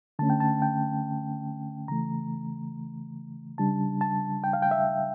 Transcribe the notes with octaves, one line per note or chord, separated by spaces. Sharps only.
D3 A3 C#4 A5
G5
A5
G5
C#3 E3 A3 A#5
C#3 G3 D4 A5
A5
G5
F5
G5
E5